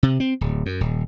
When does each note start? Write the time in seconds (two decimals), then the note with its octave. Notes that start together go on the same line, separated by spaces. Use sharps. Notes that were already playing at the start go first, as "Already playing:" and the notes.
0.03 C3
0.20 C4
0.41 D1
0.66 F#2
0.81 D#1